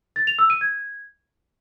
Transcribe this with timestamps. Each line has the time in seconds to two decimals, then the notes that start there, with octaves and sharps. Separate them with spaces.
0.16 A6
0.27 F7
0.39 E6
0.50 D#7
0.61 G#6